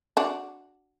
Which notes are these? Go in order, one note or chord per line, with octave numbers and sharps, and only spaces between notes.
D4 F#4